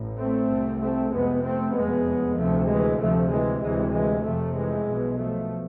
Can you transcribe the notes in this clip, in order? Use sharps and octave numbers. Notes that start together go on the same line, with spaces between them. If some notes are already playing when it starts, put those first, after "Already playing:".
Already playing: A1 A2
A3 C4
C2 C3
A3 C4
F1 F2 C3 G#3 B3
A3 C4
F1 E2 B2 G#3 B3
D2 C3 F3 A3
E3 G#3
D2 C3 F3 A3
E3 G#3
D2 C3 E3 G#3
E3 G#3
F1 F2 C3 F3 A3
E3 G#3
B1 B2
F3 A3